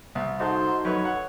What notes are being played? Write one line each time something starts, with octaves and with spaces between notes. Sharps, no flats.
C2
D#4 F#4 A4 C5
F#2 B4 C#5 C#6
F#5